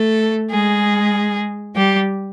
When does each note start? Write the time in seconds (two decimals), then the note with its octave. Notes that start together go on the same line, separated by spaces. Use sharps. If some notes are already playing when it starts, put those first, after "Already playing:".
Already playing: A3 A4
0.51 G#3 G#4
1.76 G3 G4